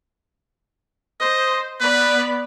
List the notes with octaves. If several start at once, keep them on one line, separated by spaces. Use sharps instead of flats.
C5 D#5
B3 B4 D5 B5